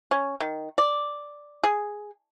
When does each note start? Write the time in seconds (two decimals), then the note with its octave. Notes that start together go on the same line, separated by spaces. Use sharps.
0.11 C#4
0.40 D#3
0.78 D5
1.63 G#4